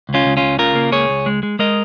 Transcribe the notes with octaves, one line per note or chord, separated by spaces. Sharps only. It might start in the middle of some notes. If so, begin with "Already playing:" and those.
C#2
C#4 F4
C#2
C#2 C#4 F4
C#3 F4 A#4
A#3
C#2 G#4 C#5
C#2
G#3
G#3
G#3 A#4 D#5